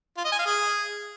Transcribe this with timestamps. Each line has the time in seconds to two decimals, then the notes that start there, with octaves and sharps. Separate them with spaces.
0.17 F4
0.25 D#5
0.32 G#5
0.39 F5
0.46 G#4